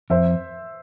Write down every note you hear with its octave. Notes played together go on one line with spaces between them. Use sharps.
F2 C5 E5